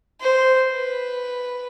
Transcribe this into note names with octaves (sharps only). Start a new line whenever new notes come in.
C5
B4